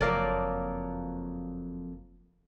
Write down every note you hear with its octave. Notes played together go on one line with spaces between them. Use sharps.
F#1 F2 F3 F#3 A#3 A#4 D5